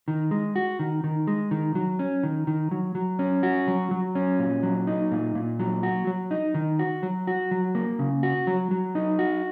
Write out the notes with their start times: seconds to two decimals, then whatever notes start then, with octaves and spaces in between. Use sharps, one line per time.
0.08 D#3
0.31 G#3
0.56 F#4
0.79 D#3
1.04 D#3
1.27 G#3
1.51 D#3
1.75 F#3
1.99 C#4
2.23 D#3
2.47 D#3
2.71 F#3
2.95 F#3
3.19 C#4
3.43 F#4
3.68 F#3
3.91 F#3
4.15 C#4
4.39 A#2
4.63 F#3
4.87 D#4
5.12 A#2
5.35 A#2
5.59 F#3
5.83 F#4
6.07 F#3
6.31 D#4
6.54 D#3
6.79 F#4
7.03 F#3
7.27 F#4
7.51 F#3
7.75 A#3
7.99 C#3
8.23 F#4
8.47 F#3
8.71 F#3
8.95 D#4
9.19 F#4